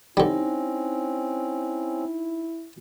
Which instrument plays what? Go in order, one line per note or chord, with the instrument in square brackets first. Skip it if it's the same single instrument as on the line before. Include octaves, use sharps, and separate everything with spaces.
[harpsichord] D3 G3 [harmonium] C4 C#4 [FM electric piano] D#4 [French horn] E4